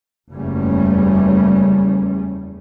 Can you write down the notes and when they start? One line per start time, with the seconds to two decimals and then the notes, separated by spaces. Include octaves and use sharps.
0.34 F#1 E2 G3 A3 C#4